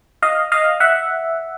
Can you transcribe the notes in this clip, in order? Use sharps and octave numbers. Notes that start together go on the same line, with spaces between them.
D#5 F5
D#5 F5
E5 F#5